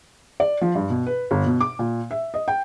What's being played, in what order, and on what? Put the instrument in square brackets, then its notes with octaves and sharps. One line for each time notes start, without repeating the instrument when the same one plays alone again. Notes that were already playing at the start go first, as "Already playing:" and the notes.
[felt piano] D5
F3
G2
B2
B4
G1
B2
D6
A#2
E5
D#5
G5